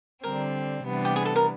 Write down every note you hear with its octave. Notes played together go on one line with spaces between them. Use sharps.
D3 G3 C4 A#4
C3 E3 G3 B3 D4
G4
G#4
A4
A#4